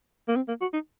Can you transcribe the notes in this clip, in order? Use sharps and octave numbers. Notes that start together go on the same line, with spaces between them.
A#3
C4
A#3
F#4
D#4